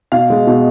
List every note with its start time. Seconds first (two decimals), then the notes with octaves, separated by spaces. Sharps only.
0.12 B2 F5
0.30 G#3
0.47 B2